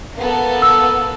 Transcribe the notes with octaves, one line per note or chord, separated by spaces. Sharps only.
A#3 B3 A4
E6